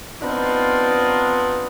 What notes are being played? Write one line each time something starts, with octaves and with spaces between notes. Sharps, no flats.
B3 C4 D4 D#4 F4